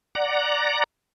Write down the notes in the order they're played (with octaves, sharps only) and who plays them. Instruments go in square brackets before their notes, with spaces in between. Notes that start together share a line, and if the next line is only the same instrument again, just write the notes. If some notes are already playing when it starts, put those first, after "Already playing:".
[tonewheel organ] D5 F#5 A#5